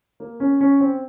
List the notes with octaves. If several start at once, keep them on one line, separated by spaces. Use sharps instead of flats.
A#3
C#4
C#4
C4